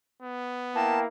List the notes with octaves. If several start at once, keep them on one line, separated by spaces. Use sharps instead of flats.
B3
A#3 E4 A#4 G5 A5